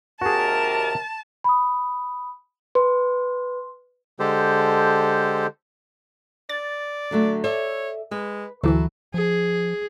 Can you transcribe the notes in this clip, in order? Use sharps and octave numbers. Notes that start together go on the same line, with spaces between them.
D#2 C3 F#4 G#4 A#4 A5
B5 D#6
B4 C6
D3 G#3 G4 A4 C5
D5 A6
D3 F#3 A3
A4 C#5 D5 E5
G#3 B4
D2 E3 F#3 E4 A4
F3 G#4